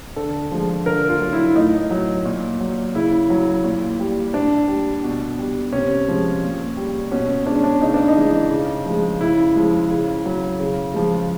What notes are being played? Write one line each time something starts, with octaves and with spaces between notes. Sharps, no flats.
D3 A4
F3 G#3
D3 A#4
F4
F#3
E4
A2 D#4
F#3
A#2
F#3
C#3 E4
F#3
A#2
G3
A#2 D4
G3
B2
G3
C3 C#4
F3 G#3
A#2
G3
B2 C#4
G#3 D4
C#4
D4
C#3 D#4
D4
D#4
E3 G#3
C#3
F3 G#3
C#3 E4
F3 G#3
C#3
F#3
C#3
F3 G#3